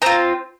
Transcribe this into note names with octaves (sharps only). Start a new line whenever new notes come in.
C4 F4 A#5